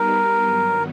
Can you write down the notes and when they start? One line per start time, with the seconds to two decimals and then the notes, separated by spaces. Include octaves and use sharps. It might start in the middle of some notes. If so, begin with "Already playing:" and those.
Already playing: G3 B3 D#4 G4 A#4 B4
0.41 G2 D#3 F#3 B3